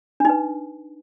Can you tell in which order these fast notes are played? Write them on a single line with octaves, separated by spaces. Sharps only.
D4 D#4 B4